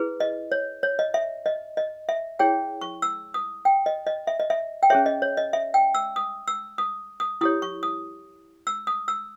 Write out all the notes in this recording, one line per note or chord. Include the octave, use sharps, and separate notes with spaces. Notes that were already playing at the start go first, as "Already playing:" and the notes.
Already playing: E4 G#4 B4
D#5
C#5
C#5
D#5
E5
D#5
D#5
E5
E4 G#4 C#5 G5
C#6
E6
D#6
G5
D#5
D#5
E5
D#5
E5
G5
C#4 G#4 C#5 E5
D#5
C#5
D#5
E5
G5
E6
D#6
E6
D#6
D#6
E4 G4 C#5 D#6
C#6
D#6
E6
D#6
E6